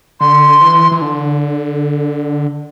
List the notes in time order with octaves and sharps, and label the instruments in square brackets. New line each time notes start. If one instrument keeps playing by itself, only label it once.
[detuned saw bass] D3 [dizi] C6
[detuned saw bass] E3
E3
D3